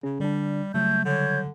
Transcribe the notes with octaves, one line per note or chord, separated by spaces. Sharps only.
C#3 C#4 G#4
D3 G3 D4
C#3 F#3 G3 A3 G6
D3 C#5 G6